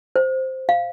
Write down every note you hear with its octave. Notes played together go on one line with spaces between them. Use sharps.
C5
F5